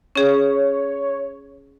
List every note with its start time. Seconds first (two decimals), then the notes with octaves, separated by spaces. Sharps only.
0.16 C#4 G#4 C#5